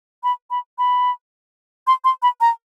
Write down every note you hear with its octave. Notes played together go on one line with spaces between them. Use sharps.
B5
B5
B5
C6
C6
B5
A#5